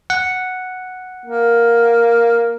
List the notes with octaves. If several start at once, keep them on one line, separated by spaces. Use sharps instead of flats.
F#5
A#3